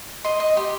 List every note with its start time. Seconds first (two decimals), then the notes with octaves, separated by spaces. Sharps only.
0.24 D#5 C6
0.40 D#5
0.57 G4 C6